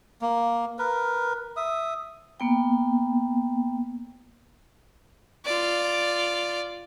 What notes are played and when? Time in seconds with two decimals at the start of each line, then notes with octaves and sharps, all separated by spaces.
0.22 A#3
0.79 A#4 B4
1.56 E5 D#6
2.40 A#3 B3 G5
5.45 F4 D5